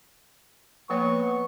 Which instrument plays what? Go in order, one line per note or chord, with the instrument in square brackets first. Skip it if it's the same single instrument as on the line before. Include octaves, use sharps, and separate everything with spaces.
[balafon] F3 A#3 C#5 [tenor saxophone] B3 [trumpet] C#6